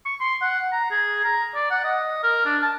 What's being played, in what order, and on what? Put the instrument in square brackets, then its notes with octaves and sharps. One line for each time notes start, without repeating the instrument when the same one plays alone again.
[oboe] C#6
C6
F#5
A#5
G#4
A#5
D5
F#5
D#5
A#4
D4
A5